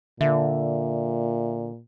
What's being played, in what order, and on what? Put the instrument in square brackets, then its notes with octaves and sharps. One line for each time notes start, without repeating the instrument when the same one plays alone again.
[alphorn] A#2 [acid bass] D3 [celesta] E5